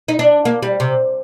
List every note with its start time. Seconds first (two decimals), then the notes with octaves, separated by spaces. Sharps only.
0.08 D#4
0.19 D4
0.45 A#3
0.62 G3
0.80 C3